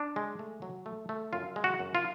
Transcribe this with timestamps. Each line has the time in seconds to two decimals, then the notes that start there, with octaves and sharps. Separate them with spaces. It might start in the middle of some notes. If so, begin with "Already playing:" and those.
Already playing: D4
0.16 G#3
0.39 A3
0.62 F#3
0.86 A3
1.09 A3
1.33 F#2 F4
1.56 G#3
1.64 F#4
1.79 F#2
1.95 F4